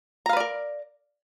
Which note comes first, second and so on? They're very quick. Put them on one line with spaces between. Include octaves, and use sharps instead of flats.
A#5 F5 B4 D5 A#4